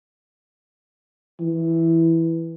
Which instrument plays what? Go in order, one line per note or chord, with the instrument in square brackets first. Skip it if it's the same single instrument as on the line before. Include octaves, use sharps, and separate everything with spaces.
[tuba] E3